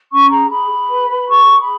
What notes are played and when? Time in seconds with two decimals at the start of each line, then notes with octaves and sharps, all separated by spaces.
0.11 C#4 C#6
0.31 G#4 A#5
0.51 G#4 B5
0.71 G#4
0.91 B4
1.10 B4
1.30 G#4 C#6
1.49 G#4
1.59 B5